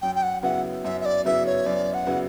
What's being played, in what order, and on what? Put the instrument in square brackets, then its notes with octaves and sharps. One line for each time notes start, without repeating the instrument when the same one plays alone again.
[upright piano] F#2 [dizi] G5
[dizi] G5
F#5
[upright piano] C#3 F#3 B3 E4 [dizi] F#5
[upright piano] F#2 [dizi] E5
[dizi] E5
D5
[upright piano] C#3 F#3 B3 E4 [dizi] E5
[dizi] C#5
[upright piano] F#2 [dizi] D5
[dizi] F#5
[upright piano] C#3 F#3 B3 E4